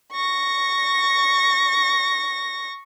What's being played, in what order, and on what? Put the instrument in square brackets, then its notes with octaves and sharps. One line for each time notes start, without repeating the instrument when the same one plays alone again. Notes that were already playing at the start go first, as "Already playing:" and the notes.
[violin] C#6 A#6